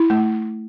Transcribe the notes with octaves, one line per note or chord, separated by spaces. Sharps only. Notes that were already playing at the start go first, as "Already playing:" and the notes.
Already playing: E4
A3